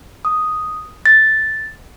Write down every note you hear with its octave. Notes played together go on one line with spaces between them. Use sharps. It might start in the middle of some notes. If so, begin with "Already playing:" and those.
D#6
A6